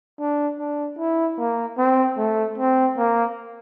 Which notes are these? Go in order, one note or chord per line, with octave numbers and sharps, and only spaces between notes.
D4
D4
E4
A#3
C4
A3
C4
A#3